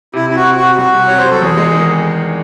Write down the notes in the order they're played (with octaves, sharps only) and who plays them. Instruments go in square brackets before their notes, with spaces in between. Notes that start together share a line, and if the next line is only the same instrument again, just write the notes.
[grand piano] C3 [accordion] E4
[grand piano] C4 [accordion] E4
[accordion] F#4
[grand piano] C4
[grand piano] C3 [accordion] F#4
[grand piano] C2 [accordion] F#4
[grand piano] C3
[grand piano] C3 [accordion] C#5
[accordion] C5
[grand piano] F#3
[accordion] A4
[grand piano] E2 [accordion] G#4
[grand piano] G#3
D#3